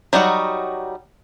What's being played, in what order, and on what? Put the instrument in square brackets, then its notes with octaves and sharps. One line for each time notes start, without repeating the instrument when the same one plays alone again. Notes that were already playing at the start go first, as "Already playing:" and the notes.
[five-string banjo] F#3 G3 D#4 F4 F#4